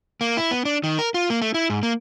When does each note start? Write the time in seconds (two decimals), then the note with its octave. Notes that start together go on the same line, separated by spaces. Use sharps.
0.21 A#3
0.37 E4
0.51 B3
0.65 D4
0.83 D#3
0.99 A#4
1.14 F4
1.30 A#3
1.42 A3
1.54 E4
1.70 G#2
1.83 A#3